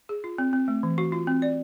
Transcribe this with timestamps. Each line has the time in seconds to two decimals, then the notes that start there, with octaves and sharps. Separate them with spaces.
0.09 G#4
0.24 F4
0.38 C4
0.53 C4
0.68 A3
0.83 E3
0.98 F#4
1.12 F4
1.27 C4
1.42 D5